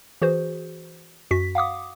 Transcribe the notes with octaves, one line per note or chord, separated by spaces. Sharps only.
E3 F#4 G#4 C5
F#2 F#4 B6
F5 F#5 D6 D#6